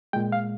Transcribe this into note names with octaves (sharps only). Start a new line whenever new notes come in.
A#2 G#3 G5
F5